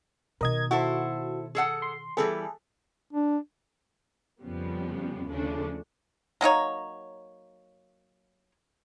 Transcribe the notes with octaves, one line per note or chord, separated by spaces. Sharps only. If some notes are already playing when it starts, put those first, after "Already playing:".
B2 D#3 A#4 D#5 G#6
E4 F#4 A4 C5
G#4 A4 F#5
C6
E3 G3 B3 G#4 A4
D4
F2 C#3 F3 G3 B3
D#2 C#3 F3 A3 D4
F#3 A#3 D#4 C#5